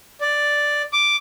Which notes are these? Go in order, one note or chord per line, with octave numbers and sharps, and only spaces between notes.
D5
D6